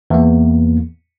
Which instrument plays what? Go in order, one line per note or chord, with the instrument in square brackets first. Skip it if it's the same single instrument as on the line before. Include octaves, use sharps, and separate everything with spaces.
[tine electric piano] E2 A#3